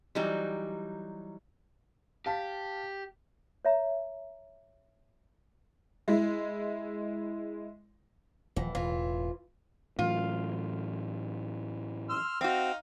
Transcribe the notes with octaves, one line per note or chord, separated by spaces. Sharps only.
E3 F#3 G3 D#4
G4 F5 A5 B6
C#5 E5 A#5
G#3 E4
D#1 E3 F3
E1 A2 E3 F4
A2 E3 F#3 F4
C6 E6 F6
C4 D#4 F#4 F5